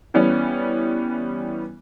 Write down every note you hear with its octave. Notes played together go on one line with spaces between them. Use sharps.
E3 G3 B3 C#4